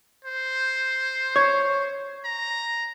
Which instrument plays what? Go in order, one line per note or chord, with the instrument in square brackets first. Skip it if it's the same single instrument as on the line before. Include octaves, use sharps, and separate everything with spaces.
[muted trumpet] C5
[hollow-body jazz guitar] C#5
[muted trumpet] A#5